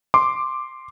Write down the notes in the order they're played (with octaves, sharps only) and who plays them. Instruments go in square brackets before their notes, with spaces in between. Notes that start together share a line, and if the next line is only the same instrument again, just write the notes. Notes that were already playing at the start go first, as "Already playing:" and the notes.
[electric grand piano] C6 D6